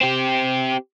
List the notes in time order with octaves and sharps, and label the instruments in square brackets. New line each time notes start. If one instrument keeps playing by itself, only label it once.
[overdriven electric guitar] C4 G4